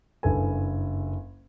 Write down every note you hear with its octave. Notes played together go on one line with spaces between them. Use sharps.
F#1 G2 E4 A4 B4 G#5